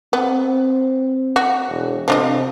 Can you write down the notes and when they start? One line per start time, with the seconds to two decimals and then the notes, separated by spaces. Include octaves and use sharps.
0.13 B3 C4
1.36 F#4
1.69 E1
2.08 C3 F3 D4 D#5